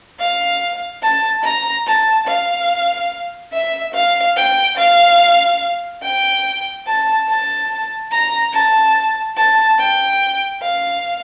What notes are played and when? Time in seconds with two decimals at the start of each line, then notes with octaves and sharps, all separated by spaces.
0.20 F5
1.03 A5
1.44 A#5
1.86 A5
2.27 F5
3.53 E5
3.94 F5
4.37 G5
4.78 F5
6.03 G5
6.87 A5
7.29 A5
8.11 A#5
8.53 A5
9.37 A5
9.79 G5
10.62 F5